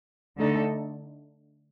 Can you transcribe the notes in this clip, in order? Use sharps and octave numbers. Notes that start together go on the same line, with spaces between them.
D3 A3 D#4 A4